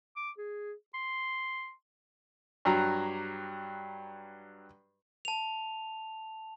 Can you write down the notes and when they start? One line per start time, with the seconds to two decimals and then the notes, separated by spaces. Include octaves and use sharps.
0.17 D6
0.38 G#4
0.94 C6
2.65 G2 F#3 A#5 F#6
5.25 A5 F7